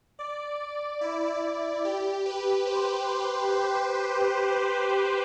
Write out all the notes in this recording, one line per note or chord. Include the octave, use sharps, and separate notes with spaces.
D5
E4
E4
G4
B4
C5